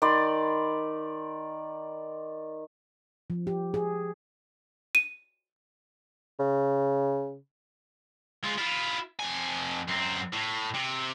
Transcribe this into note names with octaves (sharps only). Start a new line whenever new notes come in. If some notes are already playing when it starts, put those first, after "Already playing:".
D#3 D5 B5 C6
F3
G4
G#4
D#7
C#3
G#3 F4
E4 F4
F2 G#5
F#2 C4
A2
C3